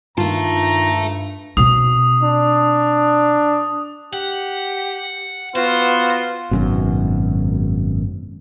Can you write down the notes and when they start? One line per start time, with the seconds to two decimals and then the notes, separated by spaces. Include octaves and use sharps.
0.18 G2 D#3 F4 E5 A5 A#5
1.57 B2 C4 D#6
2.23 D4
4.13 G4 F#5
5.56 B3 F4 F#4 C5
6.51 G#1 F#2 B2